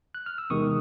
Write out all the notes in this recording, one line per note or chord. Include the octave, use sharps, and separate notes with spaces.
F#6
F6
E6
E2 C3 D#3 G#3 C#6 D#6